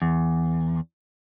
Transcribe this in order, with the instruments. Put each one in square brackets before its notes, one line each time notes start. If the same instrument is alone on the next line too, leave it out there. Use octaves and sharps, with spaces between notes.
[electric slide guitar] E2